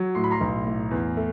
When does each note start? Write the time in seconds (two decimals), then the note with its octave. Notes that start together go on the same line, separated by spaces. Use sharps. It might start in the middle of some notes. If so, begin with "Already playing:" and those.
Already playing: F#3
0.15 A2 C6
0.24 B5
0.31 A#5 C6
0.41 B1
0.66 A2
0.91 E2
1.17 A3